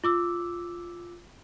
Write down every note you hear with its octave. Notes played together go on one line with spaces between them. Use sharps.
F4 D6 E6